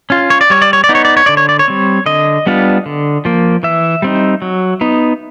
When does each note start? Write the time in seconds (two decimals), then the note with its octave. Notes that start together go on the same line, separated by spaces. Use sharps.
0.10 C#4 F4
0.30 C#5
0.41 D5
0.50 G3 C#5
0.62 D5
0.73 C#5
0.84 D5
0.89 B3 D#4
0.95 C#5
1.05 D5
1.17 C#5
1.26 D3 D5
1.37 C#5
1.49 D5
1.59 C#5
1.68 G3 C4
2.06 D3 D#5
2.46 G3 B3 D4 F4
2.86 D3
3.25 F3 A#3
3.63 E3 E5
4.02 G3 C4 D#4
4.42 F#3
4.81 B3 D#4